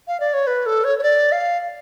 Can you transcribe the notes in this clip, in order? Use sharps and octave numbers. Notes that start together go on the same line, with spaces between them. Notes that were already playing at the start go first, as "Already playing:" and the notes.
F5
D5
C#5
B4
A4
C#5
C#5
D5
F5